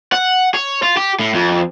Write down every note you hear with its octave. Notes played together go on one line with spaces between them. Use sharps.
F#5
C#5
F4
G4
A2
F2